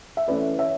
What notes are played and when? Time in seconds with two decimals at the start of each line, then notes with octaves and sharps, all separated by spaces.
0.17 E5
0.27 E3 A3 C#4 E4 B4 D5
0.58 C#5 E5